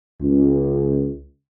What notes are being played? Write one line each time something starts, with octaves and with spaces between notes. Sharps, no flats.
C#2